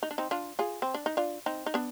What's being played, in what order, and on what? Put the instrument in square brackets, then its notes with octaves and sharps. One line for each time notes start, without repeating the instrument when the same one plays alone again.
[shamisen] D#4
D4
C4 D#4
D4 F4
F4 G#4
C4
D4
D#4
D4 F4
C4 D#4
D#4
B3 D4